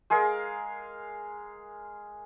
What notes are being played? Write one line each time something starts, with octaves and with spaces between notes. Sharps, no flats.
G#3 G#4 A#4 F5